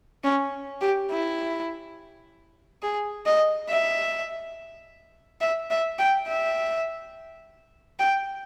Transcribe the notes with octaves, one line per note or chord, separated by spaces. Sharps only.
C#4
G4
E4
G#4
D#5
E5
E5
E5
G5
E5
G5